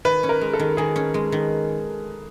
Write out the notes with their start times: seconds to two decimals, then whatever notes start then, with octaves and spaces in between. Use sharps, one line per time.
0.05 D#3 B4
0.23 C#4
0.29 A#4
0.41 G#3
0.53 A4
0.59 D#3
0.77 D#3 G#4
0.96 C#4
1.14 G#3
1.32 D#3